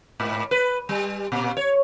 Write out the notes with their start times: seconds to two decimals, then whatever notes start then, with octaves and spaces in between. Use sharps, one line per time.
0.20 G#2
0.51 B4
0.89 G3
1.32 A#2
1.57 C#5